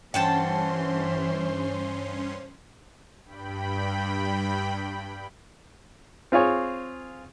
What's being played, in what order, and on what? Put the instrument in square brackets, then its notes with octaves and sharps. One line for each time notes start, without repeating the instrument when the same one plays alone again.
[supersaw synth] G2 C#4 C6 [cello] E3 [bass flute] C5 [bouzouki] F#5 G5 A5
[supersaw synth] G2 G5 B5
[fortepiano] C4 F4 G#4 C#5